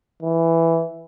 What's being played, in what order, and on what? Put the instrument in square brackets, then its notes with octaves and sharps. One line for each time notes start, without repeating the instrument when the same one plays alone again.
[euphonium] E3